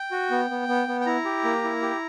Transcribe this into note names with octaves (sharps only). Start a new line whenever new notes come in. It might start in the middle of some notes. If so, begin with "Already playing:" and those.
Already playing: G5
F#4
B3
B3
B3
B3
G5
E4 A#5
G4
A#3
E4
G4